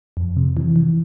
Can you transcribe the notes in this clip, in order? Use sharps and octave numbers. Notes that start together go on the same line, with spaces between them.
F2
C3
E3
E3